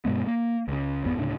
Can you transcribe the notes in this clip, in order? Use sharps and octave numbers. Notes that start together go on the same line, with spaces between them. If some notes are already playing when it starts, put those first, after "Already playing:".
G2 B2 G#3 B3
A#3
C#2 C#3
G#1 F2 B3
D2 A2 C#3 D4